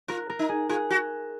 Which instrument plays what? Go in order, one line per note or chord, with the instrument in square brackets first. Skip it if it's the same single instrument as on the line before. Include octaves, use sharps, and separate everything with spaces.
[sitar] F4 [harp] A#4
[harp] A#4
[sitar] D#4
[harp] G#4
[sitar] F4 [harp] G#4
[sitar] F#4